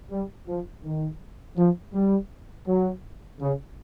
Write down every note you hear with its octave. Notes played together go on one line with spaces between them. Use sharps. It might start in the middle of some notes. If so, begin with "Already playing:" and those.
G3
F3
D#3
F3
G3
F#3
C#3